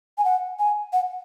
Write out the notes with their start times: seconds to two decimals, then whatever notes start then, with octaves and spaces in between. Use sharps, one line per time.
0.18 G#5
0.25 F#5
0.59 G#5
0.93 F#5